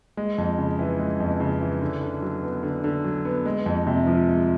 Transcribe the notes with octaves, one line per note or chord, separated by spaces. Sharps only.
G#3
F2
C#3
E3
G#3
F2
C#3
E3
D3
D3
F#3
B3
D3
D3
F#3
B3
G#3
F2
C3
F3
G#3